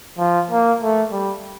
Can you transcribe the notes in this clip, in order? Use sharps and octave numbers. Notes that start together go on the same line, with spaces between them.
F3
A#3
A3
G3